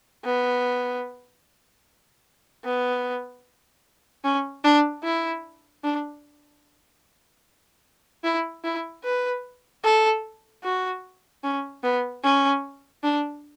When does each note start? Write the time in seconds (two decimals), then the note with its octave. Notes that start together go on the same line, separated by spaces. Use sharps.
0.25 B3
2.64 B3
4.24 C#4
4.64 D4
5.04 E4
5.84 D4
8.24 E4
8.64 E4
9.04 B4
9.84 A4
10.64 F#4
11.43 C#4
11.84 B3
12.24 C#4
13.03 D4